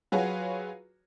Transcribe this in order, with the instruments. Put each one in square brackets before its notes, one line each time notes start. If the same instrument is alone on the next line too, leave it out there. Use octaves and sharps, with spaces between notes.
[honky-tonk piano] F#3 F4 F#4 G#4 B4 C#5